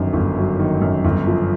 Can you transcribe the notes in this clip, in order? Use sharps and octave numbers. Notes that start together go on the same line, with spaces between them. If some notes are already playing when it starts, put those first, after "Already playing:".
Already playing: G1 F#2 D#3 F#3
G1
F#3
D#3
F#2
G1
F3